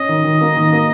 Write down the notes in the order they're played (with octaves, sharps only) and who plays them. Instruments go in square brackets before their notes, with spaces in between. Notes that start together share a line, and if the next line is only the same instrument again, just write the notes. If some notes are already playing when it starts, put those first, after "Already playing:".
Already playing: [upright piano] C#4 [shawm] D#5
[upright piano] D#3
D#3
A#3
D#3
A#3